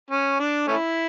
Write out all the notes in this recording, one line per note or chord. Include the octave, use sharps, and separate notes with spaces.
C#4
D4
A3 C#4 E4